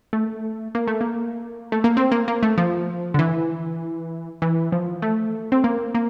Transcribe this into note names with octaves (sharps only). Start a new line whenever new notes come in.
A3
A#3
A3
A#3
A3
A#3
C4
A#3
A#3
A3
F3
D3
E3
E3
F3
A3
C4
A#3
A#3